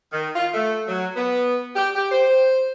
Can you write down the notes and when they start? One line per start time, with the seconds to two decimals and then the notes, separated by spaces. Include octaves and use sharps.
0.12 D#3
0.36 F4
0.54 A3
0.87 F#3
1.16 B3
1.76 G4
1.95 G4
2.11 C5